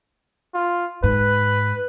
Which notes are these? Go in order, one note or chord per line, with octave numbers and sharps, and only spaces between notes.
F4
G#2 B4